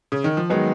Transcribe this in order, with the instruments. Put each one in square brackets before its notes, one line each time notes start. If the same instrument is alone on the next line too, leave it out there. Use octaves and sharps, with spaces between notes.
[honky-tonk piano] C#3
D#3
F3
[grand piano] D#3 G#3 B3 [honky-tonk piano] F#3